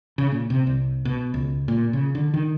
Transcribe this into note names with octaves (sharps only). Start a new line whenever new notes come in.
C#3
A#2
C3
C2
B2
C#2
A#2
C#3
D3
D#3